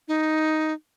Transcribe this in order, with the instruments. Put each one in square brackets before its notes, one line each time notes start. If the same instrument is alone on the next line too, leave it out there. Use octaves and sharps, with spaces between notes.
[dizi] D#4